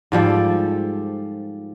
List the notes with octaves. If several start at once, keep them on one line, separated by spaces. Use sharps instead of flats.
G#2 F3 G3 A4